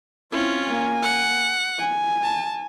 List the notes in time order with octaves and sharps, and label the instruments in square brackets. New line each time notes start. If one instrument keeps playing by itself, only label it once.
[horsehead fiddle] C4 E4 [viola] C#4 F4
[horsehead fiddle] A#3 G#5
[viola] F#5
[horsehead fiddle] G#5
[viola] A5